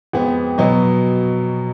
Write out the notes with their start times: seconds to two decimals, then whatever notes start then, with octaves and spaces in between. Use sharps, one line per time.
0.13 F2 F3 G#3 B3 F#5
0.58 B2 F#3 B3 D#5